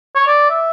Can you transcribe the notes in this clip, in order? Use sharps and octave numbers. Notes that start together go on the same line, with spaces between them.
C#5
D5
E5